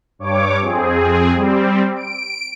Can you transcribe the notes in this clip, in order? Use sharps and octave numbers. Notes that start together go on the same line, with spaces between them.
G2 C#5 D6
F2 C4 G#4
G3 C4
D7